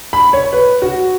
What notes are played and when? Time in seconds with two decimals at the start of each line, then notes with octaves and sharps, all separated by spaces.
0.13 B5
0.33 C#5
0.53 B4
0.82 F#4